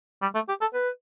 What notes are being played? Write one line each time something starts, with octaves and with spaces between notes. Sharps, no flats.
G3
A3
G4
A4
B4